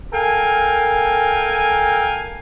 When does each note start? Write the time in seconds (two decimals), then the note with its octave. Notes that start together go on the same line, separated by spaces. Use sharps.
0.13 A4 A#4 F5 G5 G#5